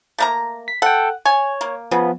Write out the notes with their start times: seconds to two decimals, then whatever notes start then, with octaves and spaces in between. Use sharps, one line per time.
0.19 A3 A#3 A#5
0.68 B6
0.82 A4 F#5 G5
1.25 C#5 G#5
1.61 A#3
1.91 C#3 F3 B3